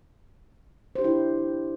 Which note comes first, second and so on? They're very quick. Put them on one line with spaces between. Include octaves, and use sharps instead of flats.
C5 G4 D4 E4